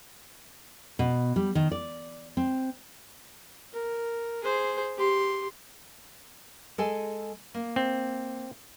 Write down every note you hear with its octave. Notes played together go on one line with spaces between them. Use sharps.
B2
G3
D#3
D5
C4
A#4
G#4 C5
G4 C6
G#3 A4 G#5
A#3
C4